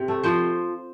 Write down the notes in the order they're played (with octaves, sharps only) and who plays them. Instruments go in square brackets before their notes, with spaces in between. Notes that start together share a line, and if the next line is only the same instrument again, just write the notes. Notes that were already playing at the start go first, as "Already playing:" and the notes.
Already playing: [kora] C3
A3
F3 C5